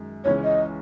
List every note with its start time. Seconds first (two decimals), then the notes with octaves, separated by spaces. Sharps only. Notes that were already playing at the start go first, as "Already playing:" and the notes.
Already playing: F#2 D#3 G#3
0.24 C#2 C#3 E3 G#3 C#4 C#5
0.44 D#5